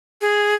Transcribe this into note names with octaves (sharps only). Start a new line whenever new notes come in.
G#4